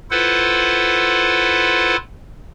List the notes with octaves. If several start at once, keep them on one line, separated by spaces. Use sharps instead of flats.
E4 F4 A4 B4 C5 F#5